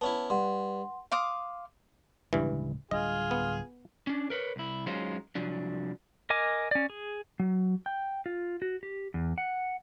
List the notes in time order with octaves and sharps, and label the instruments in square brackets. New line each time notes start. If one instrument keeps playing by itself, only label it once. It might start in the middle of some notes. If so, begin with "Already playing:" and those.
[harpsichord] B3 C#4 E4 [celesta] A5
[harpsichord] G2 [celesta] F#5 C6
[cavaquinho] F5 C6 D6 D#6
[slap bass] D1 C#3 G#3 [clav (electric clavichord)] G2 E3
[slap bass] D1 G3 D4 [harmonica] F4 G#4 [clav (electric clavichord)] D#5
[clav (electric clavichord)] B3
[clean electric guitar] C#4 D4
A#4 B4 C#5
C2 E4
F#3 G#3 C#4 D#4 F4 C5
C2 F3 F#3 D4
[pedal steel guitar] A#4 D#5 G#5 D6
C#4 D5
G#4
[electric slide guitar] F#3
G5
F4
F#4
G4
E2
F#5